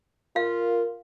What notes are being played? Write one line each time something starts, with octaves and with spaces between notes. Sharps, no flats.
F4 A#4 F5